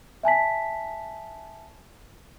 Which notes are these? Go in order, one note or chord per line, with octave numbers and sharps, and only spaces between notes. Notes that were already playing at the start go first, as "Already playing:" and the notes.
E5 G#5 A5 B6